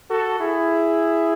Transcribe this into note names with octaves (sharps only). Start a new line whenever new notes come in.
F#4 A4
E4 G#4